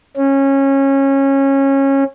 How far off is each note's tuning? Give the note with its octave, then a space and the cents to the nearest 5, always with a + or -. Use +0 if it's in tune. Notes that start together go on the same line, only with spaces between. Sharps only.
C#4 -20